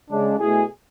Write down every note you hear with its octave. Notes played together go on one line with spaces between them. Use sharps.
C#3 G#3 D4
B2 A3 E4 G#4